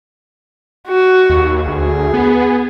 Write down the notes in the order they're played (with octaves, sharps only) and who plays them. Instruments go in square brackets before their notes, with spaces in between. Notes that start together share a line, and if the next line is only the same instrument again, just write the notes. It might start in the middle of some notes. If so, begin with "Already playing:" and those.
[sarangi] F#4
[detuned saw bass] D#2
[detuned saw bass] D2 [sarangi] G#4
[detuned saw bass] B3